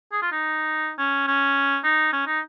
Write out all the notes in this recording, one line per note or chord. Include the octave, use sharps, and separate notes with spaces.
G#4
F4
D#4
C#4
C#4
D#4
C#4
D#4